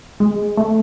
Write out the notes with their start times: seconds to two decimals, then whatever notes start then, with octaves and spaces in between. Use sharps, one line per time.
0.20 G#3
0.57 A3